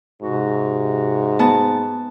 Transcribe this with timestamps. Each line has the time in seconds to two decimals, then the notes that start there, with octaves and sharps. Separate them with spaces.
0.22 G#2 C3 F#4
1.39 B3 A5